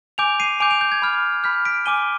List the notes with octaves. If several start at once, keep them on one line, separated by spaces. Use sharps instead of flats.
G#5 D6 G6 D7 F7
C7 D#7
G#5 D6 G6 D7 F7
D7 F7
G6
G#6
B5 F6
B5 F6 G6 B6
B6 D7
G#5 D6 F6 D#7 G7